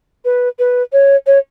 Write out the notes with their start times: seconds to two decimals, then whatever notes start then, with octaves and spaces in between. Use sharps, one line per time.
0.25 B4
0.59 B4
0.93 C#5
1.26 C#5